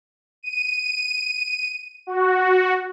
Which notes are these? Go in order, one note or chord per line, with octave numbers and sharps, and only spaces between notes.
D#7
F#4